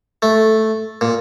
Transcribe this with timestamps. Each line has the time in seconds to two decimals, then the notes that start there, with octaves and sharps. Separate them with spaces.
0.22 A3
1.01 A#2